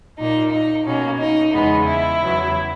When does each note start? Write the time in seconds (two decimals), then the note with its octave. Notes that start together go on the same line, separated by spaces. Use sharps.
0.19 A#2 A#3 D#4
0.52 D#4
0.86 B2 A#3 C#4
1.19 D#4
1.53 E2 C#3 G#3 B3 D#4
1.86 E4
2.20 E2 C#3 F#3 B3